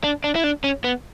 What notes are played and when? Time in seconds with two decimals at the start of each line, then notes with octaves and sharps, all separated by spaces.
0.04 D4
0.24 D4
0.35 E4
0.44 D4
0.64 C#4
0.84 B3